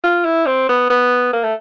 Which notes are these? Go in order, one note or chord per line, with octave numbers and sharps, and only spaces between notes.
F4
E4
C4
B3
B3
A#3
A3